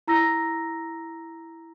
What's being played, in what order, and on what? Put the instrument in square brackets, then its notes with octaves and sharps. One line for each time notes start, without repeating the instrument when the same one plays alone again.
[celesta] E4 A#5 E6 A#6